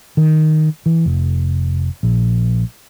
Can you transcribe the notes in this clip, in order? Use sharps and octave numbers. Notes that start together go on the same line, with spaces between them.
D#3
E3
F1
A#1